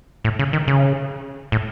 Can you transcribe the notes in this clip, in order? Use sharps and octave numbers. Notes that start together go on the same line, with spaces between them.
A2
C#3
D#3
C#3
A2